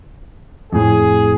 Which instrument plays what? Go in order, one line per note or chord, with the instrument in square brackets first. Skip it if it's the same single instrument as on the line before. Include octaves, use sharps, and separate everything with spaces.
[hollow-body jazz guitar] F2 A2 [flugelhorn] G#4